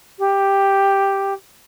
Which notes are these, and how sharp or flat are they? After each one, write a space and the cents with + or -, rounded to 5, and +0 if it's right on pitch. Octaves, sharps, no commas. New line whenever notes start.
G4 +5